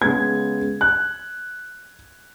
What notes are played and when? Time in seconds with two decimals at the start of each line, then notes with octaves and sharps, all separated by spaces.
0.01 C#3 G#3 B3 G#6
0.81 F#6